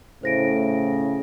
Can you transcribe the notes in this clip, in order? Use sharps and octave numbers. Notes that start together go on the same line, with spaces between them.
A2 C#3 C5 A#6 D7